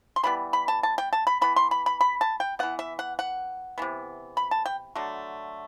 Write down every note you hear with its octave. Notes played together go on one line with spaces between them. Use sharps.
C6
E3 G3 B3 B5
B5
A5
A5
G5
A5
B5
E3 B3 B5
C6
B5
B5
B5
A5
G5
E3 B3 F#5
E5
F#5
F#5
C3 E3 B3
B5
A5
G5
D3 F#3 A3